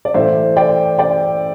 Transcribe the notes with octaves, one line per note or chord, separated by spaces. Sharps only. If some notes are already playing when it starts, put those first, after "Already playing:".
D5
A2 E3 A3 C5 E5
D5 G5
D5 G5